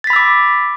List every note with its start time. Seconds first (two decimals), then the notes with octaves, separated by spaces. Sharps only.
0.04 A6
0.07 B6
0.10 B5
0.13 E6
0.16 D6